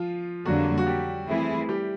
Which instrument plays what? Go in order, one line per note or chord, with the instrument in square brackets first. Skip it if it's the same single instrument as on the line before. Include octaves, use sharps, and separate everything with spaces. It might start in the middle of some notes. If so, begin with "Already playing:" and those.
Already playing: [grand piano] F3 F4
[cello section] F2 D3 G3 A#3 [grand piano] F#3 F#4
[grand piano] F#4
G3 G4
[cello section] E3 A3 C4 E4 G#4
[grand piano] G3 G4